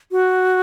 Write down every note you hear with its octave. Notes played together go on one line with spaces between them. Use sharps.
F#4